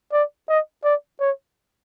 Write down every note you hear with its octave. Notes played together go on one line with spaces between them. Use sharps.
D5
D#5
D5
C#5